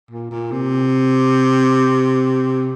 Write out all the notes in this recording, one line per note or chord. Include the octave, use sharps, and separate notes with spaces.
A#2
A#2
C3